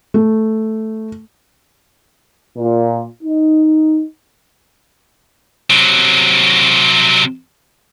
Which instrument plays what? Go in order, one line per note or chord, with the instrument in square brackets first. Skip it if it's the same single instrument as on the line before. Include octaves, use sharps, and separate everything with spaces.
[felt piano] A3
[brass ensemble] A#2
D#4
[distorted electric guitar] C3 F#3